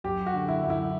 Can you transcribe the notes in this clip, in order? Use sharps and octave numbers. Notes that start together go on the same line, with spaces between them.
F#2 G4
F#4
D3
E4
F#2
E4